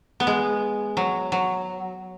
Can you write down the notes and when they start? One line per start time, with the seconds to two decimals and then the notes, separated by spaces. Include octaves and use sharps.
0.20 B3
0.27 G#3
0.97 F#3
1.32 F#3